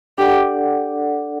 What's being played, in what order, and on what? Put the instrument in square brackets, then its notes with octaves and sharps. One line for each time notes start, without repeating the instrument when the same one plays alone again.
[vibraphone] D4 A4 D5 F#5 [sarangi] G4